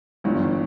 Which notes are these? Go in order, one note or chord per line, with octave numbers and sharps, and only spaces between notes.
G1 G2 E3